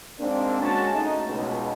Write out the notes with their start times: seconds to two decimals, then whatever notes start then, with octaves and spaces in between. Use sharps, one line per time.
0.19 G#2 A#3 C4 D4
0.61 G#3 C#4 F#4 A5
0.94 A3 D#4
1.27 C#2 B2